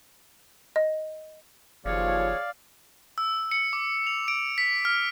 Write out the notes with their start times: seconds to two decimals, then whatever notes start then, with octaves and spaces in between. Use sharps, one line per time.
0.76 D#5
1.85 F#1 D#2 F3 G#4 C#5 D5 F5
3.18 E6
3.51 C#7
3.73 D6
4.07 F7
4.28 D7
4.58 B6
4.85 F6